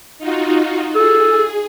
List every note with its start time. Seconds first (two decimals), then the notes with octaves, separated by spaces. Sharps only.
0.18 D#4 F4 F#4
0.95 G#4 A4